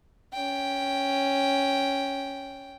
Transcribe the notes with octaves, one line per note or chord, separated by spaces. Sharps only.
C#4 G5